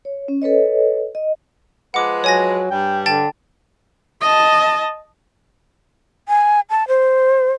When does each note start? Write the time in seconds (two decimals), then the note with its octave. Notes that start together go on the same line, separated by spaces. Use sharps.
0.05 C#5
0.28 C#4
0.42 A4 B4 C#5 D#5
1.15 D#5
1.94 F3 G#3 B4 F#5 D6
2.24 F#3 C#5 G#5 A#6
2.71 G2 G3 G5
3.06 D3 G5 A5 A6
4.22 D#5 A5
6.28 G#5
6.70 A5
6.88 C5